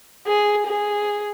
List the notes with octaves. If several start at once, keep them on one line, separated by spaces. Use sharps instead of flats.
G#4
G#4